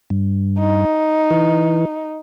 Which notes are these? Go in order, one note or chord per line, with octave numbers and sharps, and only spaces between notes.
G2
D#4
E3